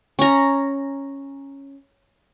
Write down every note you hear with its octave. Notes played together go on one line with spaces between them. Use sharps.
C#4 A#5